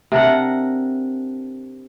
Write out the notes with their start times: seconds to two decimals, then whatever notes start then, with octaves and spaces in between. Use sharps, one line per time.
0.12 C3 D4 A#4 F#5